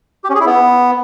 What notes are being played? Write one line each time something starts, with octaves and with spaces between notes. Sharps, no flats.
G4
C#4
G#4
E4
B3